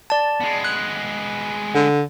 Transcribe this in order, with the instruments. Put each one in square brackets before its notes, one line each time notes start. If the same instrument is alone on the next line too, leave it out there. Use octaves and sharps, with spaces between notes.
[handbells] D5 A5
[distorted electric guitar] G#3 B3
[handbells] F#6
[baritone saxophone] D3